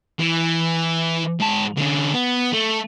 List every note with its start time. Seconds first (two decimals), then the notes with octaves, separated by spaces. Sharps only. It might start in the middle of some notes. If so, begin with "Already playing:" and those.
0.19 E3
1.40 G#2 A5
1.77 D3 C#4
2.14 B3
2.53 A3